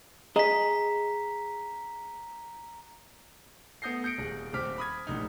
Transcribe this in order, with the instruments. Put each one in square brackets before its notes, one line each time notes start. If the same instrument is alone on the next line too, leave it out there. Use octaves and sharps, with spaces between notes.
[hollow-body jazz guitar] G#4 D#5 [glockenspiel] A#5 B6
[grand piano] A3 B3 D#6 G6 A#6 C7
G6 A#6 C#7 D7
D#1 G#4
D#1 C4 D6 F6 B6
B5 D#6 G#6
D1 A#1 D#4